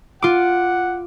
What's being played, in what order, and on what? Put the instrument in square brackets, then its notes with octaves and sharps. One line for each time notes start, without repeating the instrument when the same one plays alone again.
[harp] F4 D6 [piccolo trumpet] F#5